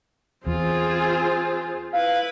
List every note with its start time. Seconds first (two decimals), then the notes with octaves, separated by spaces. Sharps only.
0.47 E2 C4 F4 G#4 C5
1.93 E4 B4 F5